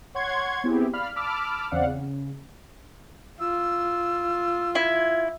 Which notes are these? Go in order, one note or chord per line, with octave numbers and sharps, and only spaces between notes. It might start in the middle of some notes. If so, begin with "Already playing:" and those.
C#5 F#5 C6 C#6 G#6
B3 C4 E4 G4 G#4
D5 F5 B5 F6
A5 B5 D6 E6 F6
E2 C#3 C4 D5 F5 F#5
C#3
F4 E6
E4 G#6